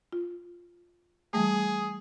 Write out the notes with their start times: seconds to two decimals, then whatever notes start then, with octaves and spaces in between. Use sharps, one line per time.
0.13 F4
1.34 E3 G3 A3 G#4